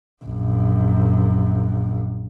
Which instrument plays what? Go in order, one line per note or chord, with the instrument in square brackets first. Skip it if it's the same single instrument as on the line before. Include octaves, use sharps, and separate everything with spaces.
[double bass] A#1 F#2